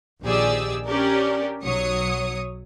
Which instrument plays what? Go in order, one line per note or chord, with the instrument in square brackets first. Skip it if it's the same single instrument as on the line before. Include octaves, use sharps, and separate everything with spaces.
[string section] A#1 D#3 G4 G#4 D5 E6
C#4 D4 G4 A#4 D5
B1 F#3 C#5 D#6 C#7